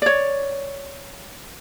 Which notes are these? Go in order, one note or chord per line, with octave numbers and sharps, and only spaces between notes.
C#5 D5